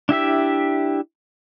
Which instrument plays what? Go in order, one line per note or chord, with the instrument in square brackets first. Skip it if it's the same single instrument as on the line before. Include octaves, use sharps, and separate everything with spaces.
[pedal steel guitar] D4 E4 G4 E5